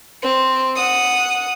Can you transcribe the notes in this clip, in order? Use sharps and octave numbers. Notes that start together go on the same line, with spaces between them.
C4
F#5 D#6